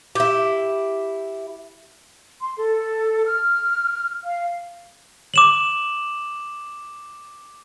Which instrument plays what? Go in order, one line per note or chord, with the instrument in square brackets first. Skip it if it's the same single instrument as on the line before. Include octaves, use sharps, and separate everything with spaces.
[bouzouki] E4 G4
[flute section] C6
A4
F6
F5
[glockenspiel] D6 E7 F#7